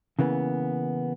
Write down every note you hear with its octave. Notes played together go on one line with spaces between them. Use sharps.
C#3 E3 A#3 B3